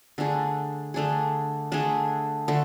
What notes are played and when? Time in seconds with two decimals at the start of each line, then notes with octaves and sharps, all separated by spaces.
0.18 D3 A3 D4 G#4
0.94 D3 A3 D4 G#4
1.72 D3 A3 D4 G#4
2.48 D3 A3